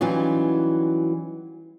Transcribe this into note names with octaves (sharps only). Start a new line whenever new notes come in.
E3 F#3 G3 C#4 D#4 F4